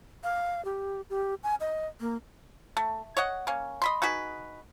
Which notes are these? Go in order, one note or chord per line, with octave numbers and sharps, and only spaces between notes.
F5
G4
G4
G#5
D#5
A#3
A3
C#5 D#5 F#5
A#3 C#4
D#5 B5 C6
D#4 F#4 G#4 B4